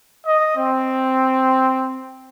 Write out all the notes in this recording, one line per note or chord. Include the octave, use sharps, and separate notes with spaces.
D#5
C4